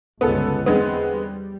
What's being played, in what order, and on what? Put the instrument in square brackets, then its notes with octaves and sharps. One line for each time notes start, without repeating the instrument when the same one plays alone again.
[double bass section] G1 C#2 [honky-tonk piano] B3 A4
[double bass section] E2 C4 [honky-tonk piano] D3 G#3 B3
[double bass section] G3